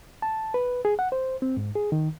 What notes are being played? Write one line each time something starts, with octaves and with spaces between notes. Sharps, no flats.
A5
B4
G#4
F#5
C5
C4
G#2
G#4
D#3